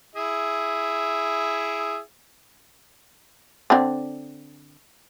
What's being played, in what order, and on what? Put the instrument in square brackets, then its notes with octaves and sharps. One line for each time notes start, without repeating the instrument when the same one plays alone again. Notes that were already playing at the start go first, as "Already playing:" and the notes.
[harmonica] E4 G#4 E5
[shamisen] D3 C4 D4